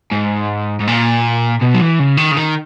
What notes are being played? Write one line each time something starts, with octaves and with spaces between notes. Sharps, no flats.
G#2
G#2
A#2
B2
F#3
E3
C#3
D#3
C#3
D#3